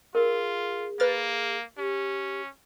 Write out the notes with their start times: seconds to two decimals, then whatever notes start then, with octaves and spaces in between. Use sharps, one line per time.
0.15 F4 G#4 A#4
1.00 A#3 B4 F6 A6
1.78 C#4 G4